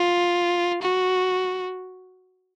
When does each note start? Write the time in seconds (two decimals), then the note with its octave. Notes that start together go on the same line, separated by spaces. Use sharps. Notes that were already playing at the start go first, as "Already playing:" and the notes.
Already playing: F4
0.81 F#4